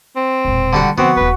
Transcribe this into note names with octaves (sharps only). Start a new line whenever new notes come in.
C4
E1 A#2
D3 G3 F#4
D3 F3 B3 C4 F#4
D#1 C#3 B4